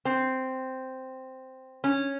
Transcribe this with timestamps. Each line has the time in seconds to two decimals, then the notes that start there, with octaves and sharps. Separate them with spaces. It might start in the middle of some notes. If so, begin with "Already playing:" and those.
0.05 C4
1.84 C#4